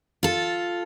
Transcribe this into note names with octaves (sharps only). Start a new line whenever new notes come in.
F4 A4